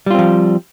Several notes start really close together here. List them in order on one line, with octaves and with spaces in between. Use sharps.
G3 F4 C4 F3